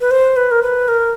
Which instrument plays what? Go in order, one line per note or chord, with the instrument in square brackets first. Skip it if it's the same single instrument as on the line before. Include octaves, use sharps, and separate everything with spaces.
[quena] B4
C5
B4
A#4
B4
A#4